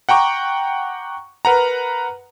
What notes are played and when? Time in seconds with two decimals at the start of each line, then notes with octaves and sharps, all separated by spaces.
0.09 F#5 G5 A#5 C#6 D6
1.45 A#4 B4 F#5 A#5